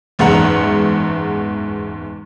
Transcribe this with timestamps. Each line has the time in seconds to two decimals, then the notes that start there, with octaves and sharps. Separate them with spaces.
0.19 F#1 E2 G#2 G#3 F#5 A#5